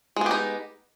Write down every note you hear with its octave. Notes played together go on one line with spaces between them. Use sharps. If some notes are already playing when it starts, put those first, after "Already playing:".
G#3 B3 D#4 G4